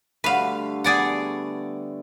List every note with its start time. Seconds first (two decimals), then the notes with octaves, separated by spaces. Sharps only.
0.24 D3 G3 A3 B4 F5
0.84 B3 G#4 D5 F#5